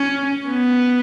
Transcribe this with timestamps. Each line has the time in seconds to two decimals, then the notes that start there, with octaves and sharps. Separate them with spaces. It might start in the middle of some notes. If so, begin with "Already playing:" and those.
Already playing: C#4
0.47 B3